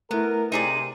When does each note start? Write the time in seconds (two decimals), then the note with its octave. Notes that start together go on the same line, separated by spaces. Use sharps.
0.11 A3 B3 E4 A#4
0.52 C3 D#4 G#4 D5 D#7